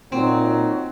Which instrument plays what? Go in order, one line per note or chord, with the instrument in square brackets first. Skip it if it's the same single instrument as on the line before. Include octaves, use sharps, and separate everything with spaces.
[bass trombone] A#2 [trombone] F#3 [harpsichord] C4 [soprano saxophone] D#4